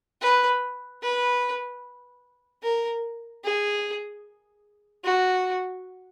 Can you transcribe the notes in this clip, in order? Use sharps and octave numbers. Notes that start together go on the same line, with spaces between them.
B4
B4
A#4
G#4
F#4